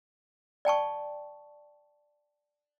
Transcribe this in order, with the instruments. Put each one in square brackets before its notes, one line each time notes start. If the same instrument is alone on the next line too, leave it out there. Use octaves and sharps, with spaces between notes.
[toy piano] D5 G5 A5 C#6